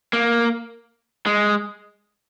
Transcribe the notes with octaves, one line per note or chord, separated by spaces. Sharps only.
A#3
G#3